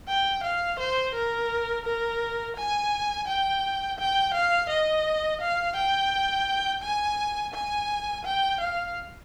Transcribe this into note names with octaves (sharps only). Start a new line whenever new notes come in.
G5
F5
C5
A#4
A#4
G#5
G5
G5
F5
D#5
F5
G5
G#5
G#5
G5
F5